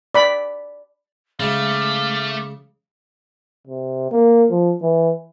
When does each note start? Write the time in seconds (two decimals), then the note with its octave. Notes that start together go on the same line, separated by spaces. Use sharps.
0.15 D5 B5
1.40 C#3 G#3 A3 F5 D6
3.67 C3
4.11 A#3
4.50 F3
4.82 E3